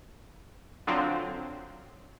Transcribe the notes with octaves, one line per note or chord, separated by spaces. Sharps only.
D3 F3 F#3 C4 F4